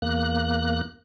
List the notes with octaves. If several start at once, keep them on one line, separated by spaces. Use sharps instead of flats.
E2 A#3 F#6